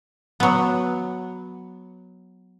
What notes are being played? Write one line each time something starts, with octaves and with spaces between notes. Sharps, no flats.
F#3 B3